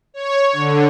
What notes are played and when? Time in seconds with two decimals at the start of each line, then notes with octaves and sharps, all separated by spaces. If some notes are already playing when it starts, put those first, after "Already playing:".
0.14 C#5
0.53 D3